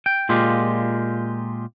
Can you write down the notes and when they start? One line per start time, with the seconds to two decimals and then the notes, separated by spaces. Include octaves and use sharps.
0.06 G5
0.29 A#2 G#3 F4 G4